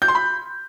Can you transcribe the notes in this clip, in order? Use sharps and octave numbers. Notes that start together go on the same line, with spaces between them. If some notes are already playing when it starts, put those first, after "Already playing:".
G6
C6
B5